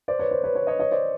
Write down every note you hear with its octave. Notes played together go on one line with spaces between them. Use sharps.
C5 D5
B4 C#5
C5
B4 C#5
B4 C#5
C#5 D#5
C#5 D#5
C5 D5